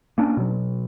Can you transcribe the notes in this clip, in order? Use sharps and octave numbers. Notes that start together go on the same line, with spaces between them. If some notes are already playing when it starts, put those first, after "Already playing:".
A#3 C#4 D4
B2 F#3